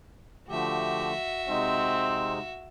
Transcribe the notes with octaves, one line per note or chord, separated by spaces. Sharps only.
D3 F3 A3 F#4 G4 E5
C3 G#3 C4 D#4